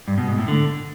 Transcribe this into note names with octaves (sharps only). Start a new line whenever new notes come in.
G2
B2
G#2
A2
D3